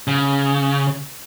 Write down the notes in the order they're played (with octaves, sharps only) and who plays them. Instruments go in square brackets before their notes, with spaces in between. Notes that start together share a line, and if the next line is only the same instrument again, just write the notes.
[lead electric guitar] C#3